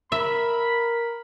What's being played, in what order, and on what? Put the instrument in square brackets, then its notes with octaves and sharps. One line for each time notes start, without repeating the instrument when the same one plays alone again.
[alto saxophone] A#4 [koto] E5 [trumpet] B5